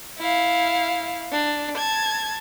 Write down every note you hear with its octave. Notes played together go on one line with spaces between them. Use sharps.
E4 F5
D4
A5 G#6